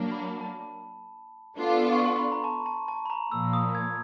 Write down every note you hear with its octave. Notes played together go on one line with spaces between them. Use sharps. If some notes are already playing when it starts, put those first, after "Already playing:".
Already playing: F#3 A#3 D4
B5
A5
B3 D4 F4 A4
C#6
C6
B5
A#5
A5
A5
A5
B5
A#5
A#2 F3 A#3 E6
D#6
G#6